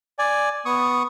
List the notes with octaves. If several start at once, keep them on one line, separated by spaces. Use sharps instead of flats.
D5 G#5
B3 C#6 D#6